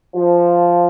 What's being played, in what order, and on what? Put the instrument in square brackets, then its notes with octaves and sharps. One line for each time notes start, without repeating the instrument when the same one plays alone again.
[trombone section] F3